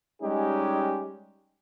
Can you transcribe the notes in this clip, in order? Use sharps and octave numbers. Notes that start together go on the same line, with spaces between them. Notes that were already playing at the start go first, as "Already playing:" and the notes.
G3 G#3 C#4 D#4 G4